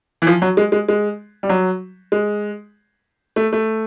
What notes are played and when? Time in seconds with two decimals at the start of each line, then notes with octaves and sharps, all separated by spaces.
0.22 E3
0.27 F3
0.42 F#3
0.57 G#3
0.72 G#3
0.89 G#3
1.43 G3
1.49 F#3
2.12 G#3
3.36 A3
3.53 A3